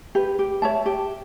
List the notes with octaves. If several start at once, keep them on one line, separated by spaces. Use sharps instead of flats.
G4 B4
G4
C#5 E5 A5
G4